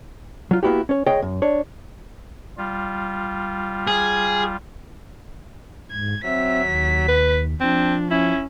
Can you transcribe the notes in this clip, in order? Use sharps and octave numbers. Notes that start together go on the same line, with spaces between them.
F#3 F4
A#3 B3 E4 F#4 G4
C#4 C#5
C#2 G#4 C#5 D#5 G5
F#2
D4 C#5
G3 F4
G#4
G#2 G#6
F#3 C4 E5 B6
D#2
B4
F3 C4 D4
C#4 E4